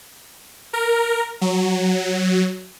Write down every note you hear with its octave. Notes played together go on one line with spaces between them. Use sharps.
A#4
F#3